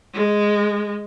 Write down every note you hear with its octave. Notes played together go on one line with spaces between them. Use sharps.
G#3